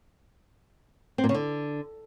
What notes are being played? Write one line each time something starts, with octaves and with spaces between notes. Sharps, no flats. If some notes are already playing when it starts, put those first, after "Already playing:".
C4
A#2
C#3
D3